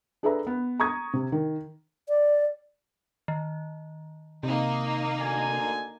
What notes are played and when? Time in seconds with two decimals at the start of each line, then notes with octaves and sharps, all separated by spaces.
0.23 D4 G#4 A4 B4 E5 A#5
0.47 B3
0.80 A#5 C#6 D#6 G#6
1.13 C3
1.32 D#3
2.09 D5
3.28 D#3
4.43 C3 A#3 D#4
5.20 D2 D3 G#5